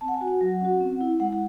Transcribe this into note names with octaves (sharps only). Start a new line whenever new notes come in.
C4 A5
F#5
G#5
F#4
F#5
F#3
C#4 F#4
C4
E4
G#3 F#5
F#5